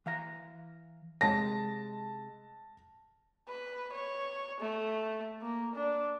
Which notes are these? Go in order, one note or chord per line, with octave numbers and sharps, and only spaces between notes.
E3 F5 A#5
C3 G#3 A5 A#6
B4
C#5
A3
A#3
D4